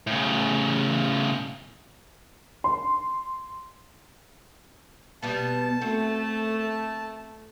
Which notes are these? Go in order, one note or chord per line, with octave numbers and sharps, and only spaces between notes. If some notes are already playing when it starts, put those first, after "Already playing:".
A2 C#3
C6
B2 G3 B3 A5
A3 C4 F#4